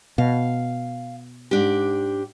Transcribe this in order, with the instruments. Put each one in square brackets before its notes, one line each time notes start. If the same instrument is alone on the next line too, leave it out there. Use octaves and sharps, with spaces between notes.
[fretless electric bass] B2 [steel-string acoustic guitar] F5
[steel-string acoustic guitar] G#2 D4 G4